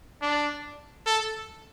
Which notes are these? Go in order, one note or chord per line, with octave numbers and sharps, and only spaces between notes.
D4
A4